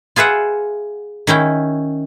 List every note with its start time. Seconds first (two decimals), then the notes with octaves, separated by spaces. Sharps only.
0.16 F4 G#4 B4 E5 F#5
1.27 D#3 C#4 E4 G5